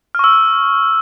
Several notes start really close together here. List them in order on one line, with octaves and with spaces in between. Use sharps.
F6 C#6 E6